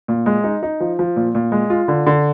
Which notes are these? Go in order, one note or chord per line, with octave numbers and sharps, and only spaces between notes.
A#2
G#3
D#4
D#4
F3
F3
A#2
A#2
G#3
F4
D3
D3